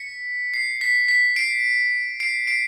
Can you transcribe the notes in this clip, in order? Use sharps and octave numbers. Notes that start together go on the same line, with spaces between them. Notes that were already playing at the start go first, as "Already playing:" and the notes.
Already playing: B6 C#7
C7
B6
B6
C7 D7
C7 D7
C7 D7